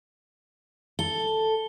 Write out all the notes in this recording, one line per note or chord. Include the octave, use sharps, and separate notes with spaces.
A4 G7